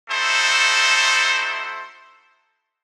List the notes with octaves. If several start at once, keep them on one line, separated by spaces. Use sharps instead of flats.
A3 D#4 E4 F#4 A4 C5